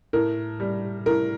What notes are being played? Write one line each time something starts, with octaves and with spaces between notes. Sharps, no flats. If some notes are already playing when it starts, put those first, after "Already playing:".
A2 A#4
G3
A2 A#4